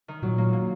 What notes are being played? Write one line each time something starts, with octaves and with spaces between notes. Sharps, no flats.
D#3
A#2 F#3
A#3
A#3